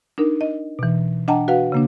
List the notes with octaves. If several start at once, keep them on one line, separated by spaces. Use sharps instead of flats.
D4 D#4 A#4
D#5
B2 E3
D4 D#5 F#5 G5 A5 A#5
F#4 B4 F5 F#5
C#3 A#3 D4